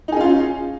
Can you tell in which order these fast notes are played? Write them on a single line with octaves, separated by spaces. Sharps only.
D#4 G#4 C#4 F4